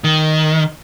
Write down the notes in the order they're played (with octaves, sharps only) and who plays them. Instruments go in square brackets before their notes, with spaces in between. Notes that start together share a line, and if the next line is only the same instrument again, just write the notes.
[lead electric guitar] D#3